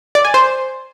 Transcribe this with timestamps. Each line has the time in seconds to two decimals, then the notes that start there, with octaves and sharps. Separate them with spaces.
0.15 D5
0.25 G#5
0.34 C5